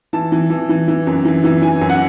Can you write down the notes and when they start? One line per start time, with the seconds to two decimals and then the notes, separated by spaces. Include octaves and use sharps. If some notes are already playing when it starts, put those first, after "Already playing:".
0.13 E3 A5
0.32 E3
0.50 E3
0.69 E3
0.88 E3
1.07 F#2
1.25 E3
1.44 E3
1.62 E3 G#5
1.81 F#2
1.89 F#5